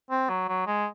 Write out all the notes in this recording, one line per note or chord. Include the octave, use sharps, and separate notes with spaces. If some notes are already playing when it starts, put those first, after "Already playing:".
C4
F#3
F#3
G#3